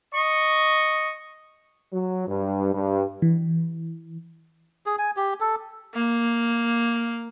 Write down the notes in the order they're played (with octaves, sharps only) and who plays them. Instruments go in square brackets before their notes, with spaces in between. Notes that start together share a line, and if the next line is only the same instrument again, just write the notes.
[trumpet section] D#5 C#6
[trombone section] F#3
G2
G2
[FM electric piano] E3
[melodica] G#4
G#5
G4
A4
[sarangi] A#3